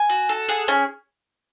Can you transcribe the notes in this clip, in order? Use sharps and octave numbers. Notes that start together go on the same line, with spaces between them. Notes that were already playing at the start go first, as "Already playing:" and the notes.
Already playing: G#5
F#4
A4
G#4 F#5
C#4 G#5